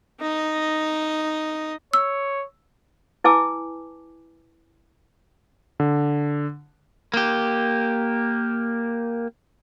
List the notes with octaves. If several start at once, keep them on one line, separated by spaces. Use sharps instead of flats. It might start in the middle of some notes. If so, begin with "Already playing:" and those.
D#4 D#5
C#5 E6
E4 B4 G#5 A5 D6 E6
D3
A#3 G4